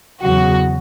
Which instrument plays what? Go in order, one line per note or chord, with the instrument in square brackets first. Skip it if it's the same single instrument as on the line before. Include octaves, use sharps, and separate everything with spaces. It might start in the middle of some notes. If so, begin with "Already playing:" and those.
[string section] E2 C#3 F#3 F#4